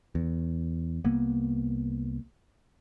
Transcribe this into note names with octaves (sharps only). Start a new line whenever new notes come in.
E2
C2 A#3 B3